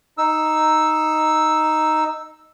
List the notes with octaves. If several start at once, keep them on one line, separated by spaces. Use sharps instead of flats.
D#4 E6